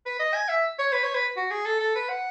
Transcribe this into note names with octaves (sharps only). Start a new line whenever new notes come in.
B4
D#5
G#5
E5
C#5
B4
C#5
B4
F#4
G#4
A4
A4
B4
F#5